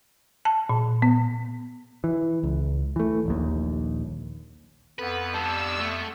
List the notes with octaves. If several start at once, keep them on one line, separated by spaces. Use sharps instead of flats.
A5
A#2
B3
E3
C#2
E3 A3
D#1 A#1 D#2
F2 B3 A4 B4 F#5
G3 D4 A5 E6
A3